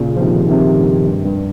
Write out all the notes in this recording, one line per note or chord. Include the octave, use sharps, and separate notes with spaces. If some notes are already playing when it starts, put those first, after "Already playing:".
Already playing: A#2 C#3
F3
C3 D#3
C3 D#3
G2
G2
G2